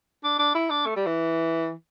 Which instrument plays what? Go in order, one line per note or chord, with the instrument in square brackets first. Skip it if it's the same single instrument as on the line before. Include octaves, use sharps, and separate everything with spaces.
[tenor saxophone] D4
D4
E4
D4
A3
G3
E3